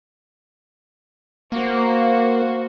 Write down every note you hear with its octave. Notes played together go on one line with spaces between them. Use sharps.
A#3 F#4 C5